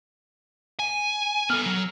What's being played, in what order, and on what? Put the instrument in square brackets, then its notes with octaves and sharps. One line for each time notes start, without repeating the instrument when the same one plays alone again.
[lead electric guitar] G#5
[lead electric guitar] B3 A4 [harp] F6
[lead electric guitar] F#3